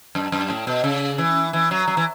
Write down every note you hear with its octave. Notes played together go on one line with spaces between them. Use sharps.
F#2
F#2
A2
B2
C#3
E3
E3
F#3
F#3
E3